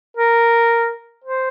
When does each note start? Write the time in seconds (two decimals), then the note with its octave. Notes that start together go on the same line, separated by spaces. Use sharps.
0.17 A#4
1.24 C5